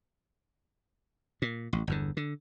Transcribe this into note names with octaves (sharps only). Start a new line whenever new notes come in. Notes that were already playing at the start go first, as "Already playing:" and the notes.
A#2
A1
G1 E2 D3
D3